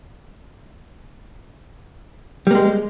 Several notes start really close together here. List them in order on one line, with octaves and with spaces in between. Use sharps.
G3 A#3 G#3